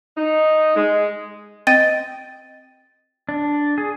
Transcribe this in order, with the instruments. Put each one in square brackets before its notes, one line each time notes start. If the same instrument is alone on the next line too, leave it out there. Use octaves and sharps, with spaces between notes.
[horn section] D#4
G#3
[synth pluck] C4 D#5 G5 [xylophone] A6 D#7
[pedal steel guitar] D4
G#4